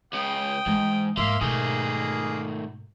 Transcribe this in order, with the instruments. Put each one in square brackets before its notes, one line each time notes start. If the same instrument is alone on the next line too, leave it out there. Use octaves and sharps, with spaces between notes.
[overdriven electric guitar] C#2 C#3 [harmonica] G5 D#6
[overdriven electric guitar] G#2 [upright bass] E3 G#3
[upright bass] G#2 [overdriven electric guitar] A#3 [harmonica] E5 F5 C6
[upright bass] G#2 B2 [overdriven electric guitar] D#3 A3 [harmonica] A#3 G#4